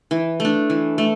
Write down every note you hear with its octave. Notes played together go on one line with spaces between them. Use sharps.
E3
A3
D4
E3
A3